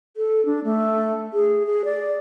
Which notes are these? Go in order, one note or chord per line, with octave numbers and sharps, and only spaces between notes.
A4
D4
A3
G#4
G#4
D5